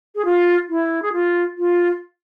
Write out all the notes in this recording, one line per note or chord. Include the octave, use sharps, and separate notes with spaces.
G#4
F4
E4
G#4
F4
F4